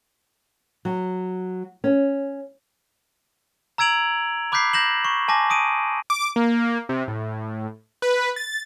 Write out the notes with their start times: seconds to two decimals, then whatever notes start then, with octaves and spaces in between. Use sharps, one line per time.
0.85 F#3
1.84 C#4
3.78 A#5 E6 G#6 D7 F7 F#7
4.52 B5 D6 F#6 G6 B6 C7
4.73 G6 A#6 E7 F#7
5.05 C#6
5.28 G#5 A5 D6 A#6
5.50 D#6 D7 D#7
6.10 D6
6.36 A#3
6.89 C3
7.08 A2
8.02 B4
8.36 A6